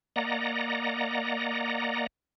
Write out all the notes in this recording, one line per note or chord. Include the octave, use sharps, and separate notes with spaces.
A#3 D5 D#5 F#5 A#5